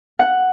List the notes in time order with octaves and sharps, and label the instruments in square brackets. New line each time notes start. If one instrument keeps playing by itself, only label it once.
[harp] F#5